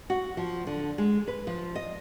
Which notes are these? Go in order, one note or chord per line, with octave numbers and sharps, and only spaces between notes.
F#4
F3
D3
G#3
B4
F3
D#5